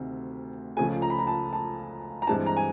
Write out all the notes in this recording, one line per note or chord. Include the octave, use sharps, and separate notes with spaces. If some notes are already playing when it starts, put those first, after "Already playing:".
Already playing: D2 C3 D#3
C#2 C#3 F3 A3 G#5
A#5
B5
A#5
A5
A5
A#5
G2 E3 G#3 C4 A5
A#5
G#5